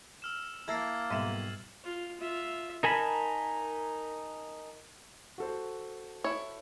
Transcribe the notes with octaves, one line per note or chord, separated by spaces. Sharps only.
E6 F6 E7
A#3 E4 A4 A#4 G#6 A6 C7
B1 G#2 G3 E5 D#7 F#7
F4
F4 E5
D#4 A#4 G#5 A5 B5
F#4 A4 C5
E4 C#5